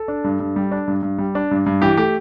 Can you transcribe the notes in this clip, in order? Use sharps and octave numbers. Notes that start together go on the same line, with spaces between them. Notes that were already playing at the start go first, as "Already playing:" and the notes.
Already playing: A4
D4
G2
G2
G3
D4
G2
G2
G3
D4
G2
G2
E3 G4
A3 G4